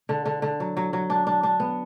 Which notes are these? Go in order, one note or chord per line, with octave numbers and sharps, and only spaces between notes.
D3
D3
D3
F#3
F#3
F#3
D4
D4
D4
B3